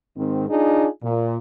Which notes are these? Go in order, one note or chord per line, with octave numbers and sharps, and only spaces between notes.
G#2 D#3 C4
D4 D#4 F4 G#4
A#2